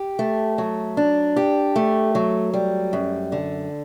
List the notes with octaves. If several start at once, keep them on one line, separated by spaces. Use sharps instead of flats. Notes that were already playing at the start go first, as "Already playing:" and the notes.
Already playing: G4
A3
F#3
D4
G4
A3
F#3
G3
F#2
D3